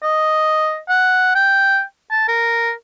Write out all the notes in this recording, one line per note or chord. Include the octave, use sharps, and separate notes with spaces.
D#5
F#5
G5
A5
A#4